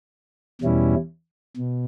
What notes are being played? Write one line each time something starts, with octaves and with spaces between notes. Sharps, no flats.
E2 B2 G3 C#4 E4
B2